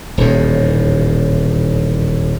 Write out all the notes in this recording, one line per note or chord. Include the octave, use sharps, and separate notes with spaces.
D#1 E2 A2